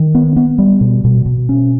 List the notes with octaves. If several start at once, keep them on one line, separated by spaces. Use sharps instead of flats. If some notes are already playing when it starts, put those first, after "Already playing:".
Already playing: D#3
B3
B3
G3
B2
B2
B2
C#4